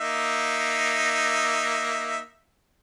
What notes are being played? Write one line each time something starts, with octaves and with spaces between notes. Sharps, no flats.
A#3 D#4 E5